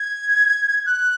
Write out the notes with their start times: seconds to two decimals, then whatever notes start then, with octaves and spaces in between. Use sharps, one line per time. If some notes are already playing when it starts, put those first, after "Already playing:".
Already playing: G#6
0.86 F#6